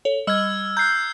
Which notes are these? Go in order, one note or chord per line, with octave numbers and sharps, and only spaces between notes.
A4 C#5
G3 D#5 E6 F6 G#6 F#7
A#5 F#6 G6 C7